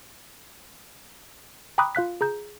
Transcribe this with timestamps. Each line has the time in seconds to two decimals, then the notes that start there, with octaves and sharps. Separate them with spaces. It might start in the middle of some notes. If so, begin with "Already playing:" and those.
1.78 G5 A#5 B5 D6 D#6 F#6
1.95 F4 F5 F#6 B6
2.21 G#4 A#5 G6